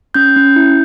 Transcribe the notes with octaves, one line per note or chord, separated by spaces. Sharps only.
C#4 G6
C#4
E4